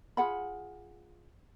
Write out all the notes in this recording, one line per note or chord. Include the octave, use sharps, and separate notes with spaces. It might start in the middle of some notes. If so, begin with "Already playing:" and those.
F4 G#4 F#5 B5